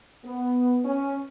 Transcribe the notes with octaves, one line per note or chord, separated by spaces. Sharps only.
B3
C#4